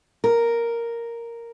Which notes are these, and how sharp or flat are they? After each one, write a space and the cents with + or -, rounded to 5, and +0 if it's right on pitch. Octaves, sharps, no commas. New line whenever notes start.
A#4 +0